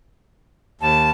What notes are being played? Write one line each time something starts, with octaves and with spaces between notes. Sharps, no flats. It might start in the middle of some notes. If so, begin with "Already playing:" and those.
D#2 A5